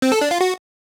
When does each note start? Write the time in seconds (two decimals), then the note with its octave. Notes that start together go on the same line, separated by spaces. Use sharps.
0.02 C4
0.12 A4
0.21 D4
0.31 F4
0.41 F#4